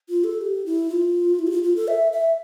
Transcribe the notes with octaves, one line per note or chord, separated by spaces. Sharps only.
F4
A4
G4
E4
F4
E4
G4
F4
F4
A4
E5
E5